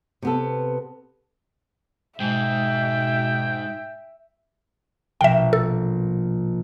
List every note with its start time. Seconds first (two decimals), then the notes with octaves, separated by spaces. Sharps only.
0.22 C3 B3 A4
2.20 G#2 B2 E5 G5
5.21 A#1 B2 A#3 E5 G5
5.53 A4